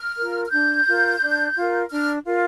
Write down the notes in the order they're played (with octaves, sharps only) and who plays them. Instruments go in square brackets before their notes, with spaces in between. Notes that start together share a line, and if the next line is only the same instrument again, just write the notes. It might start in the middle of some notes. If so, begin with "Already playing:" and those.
Already playing: [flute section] F6
F4 A#4
F6
D4 G6
F4 A#4
D4
F4 A#4
D4 F6
F4 A#4